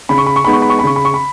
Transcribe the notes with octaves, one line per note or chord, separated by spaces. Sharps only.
C#3 B5
C#6
B5
C#6
G#3 B3 D#4 B5
C#6
B5
C#6
B5
C#3 C#6
B5
C#6
B5